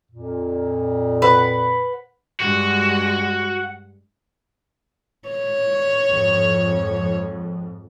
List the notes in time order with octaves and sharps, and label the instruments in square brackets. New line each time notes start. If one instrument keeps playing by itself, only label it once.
[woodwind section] F2 A#2
[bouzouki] B4 F#5
[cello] G2 G#3 [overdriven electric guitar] F#4 [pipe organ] F#5
[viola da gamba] C#5
[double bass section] F2 G#2